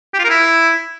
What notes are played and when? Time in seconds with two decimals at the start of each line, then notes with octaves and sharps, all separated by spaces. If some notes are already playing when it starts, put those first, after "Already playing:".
0.14 G4
0.19 F4
0.24 A#4
0.29 E4